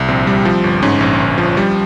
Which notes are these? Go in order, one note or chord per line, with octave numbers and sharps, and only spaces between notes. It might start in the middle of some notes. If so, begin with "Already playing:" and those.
Already playing: C2
A#1 C4
G3
F3
G1
G#2 C#4
A#1
G1
F3
G3